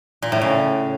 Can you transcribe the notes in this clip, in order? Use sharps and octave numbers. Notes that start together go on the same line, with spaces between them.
A#2
A2
C#3